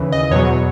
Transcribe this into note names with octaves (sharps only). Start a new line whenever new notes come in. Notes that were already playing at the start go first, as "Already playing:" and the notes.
Already playing: D#2 C#3 E3
D#5
E2 B2 F#3 C#5